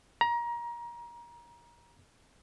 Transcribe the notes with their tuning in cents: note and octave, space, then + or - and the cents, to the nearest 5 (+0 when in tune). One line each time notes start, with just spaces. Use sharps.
A#5 +25